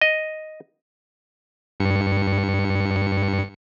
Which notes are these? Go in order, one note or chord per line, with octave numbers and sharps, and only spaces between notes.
D#5
G2 C#7